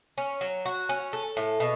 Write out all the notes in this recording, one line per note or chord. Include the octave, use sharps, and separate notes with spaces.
C#4
F#3
F#4
C#4
A4
A2
B2